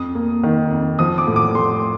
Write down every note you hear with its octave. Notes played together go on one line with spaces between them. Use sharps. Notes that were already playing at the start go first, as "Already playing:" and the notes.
Already playing: F2 D#6
A#3
D#3
F2
F3 D#6
D6
A2
D6
A3 C6